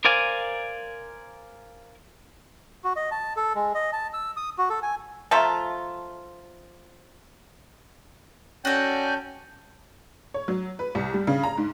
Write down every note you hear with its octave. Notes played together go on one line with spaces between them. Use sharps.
A#4 C5 D5 F5 G#5
F#4
D#5
A5
A4
G#3
D#5
A5
E6
D#6
F#4
A4
G#5
F3 A3 F4 E5 A5 A#5
C#4 F#4 A4 D5 G5 G#5 G6
C#5
F#3
B4
C2
G3
C#3
A#5
G#2